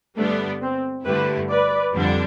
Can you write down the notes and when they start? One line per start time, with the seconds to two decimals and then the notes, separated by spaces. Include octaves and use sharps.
0.17 G2 D3 G3 A3 B3 D4
0.62 C4
1.05 G2 D3 A3 E4 G4 B4
1.50 B4 D5
1.94 F2 D3 G3 D4